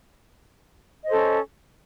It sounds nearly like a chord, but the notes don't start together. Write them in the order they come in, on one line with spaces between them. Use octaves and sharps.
D#5 C5 A4 C#4